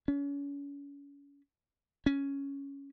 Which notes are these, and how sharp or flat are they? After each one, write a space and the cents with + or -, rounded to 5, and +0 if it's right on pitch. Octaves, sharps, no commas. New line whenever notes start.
C#4 +35
C#4 +5